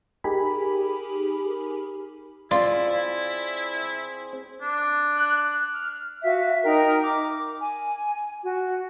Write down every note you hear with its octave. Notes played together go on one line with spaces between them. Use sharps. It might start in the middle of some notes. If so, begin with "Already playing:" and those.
D#4 G4 G#4 A#4 G#5 B5
C4 E4 F4 G#4 C5 D5
D4
F#6
F6
F#4 E5 F5
D#4 A#4 G5
D6
G#5
F#4